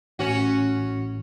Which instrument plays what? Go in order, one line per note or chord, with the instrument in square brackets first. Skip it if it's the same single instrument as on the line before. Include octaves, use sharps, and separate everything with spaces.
[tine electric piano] A1 [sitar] C#4 F#4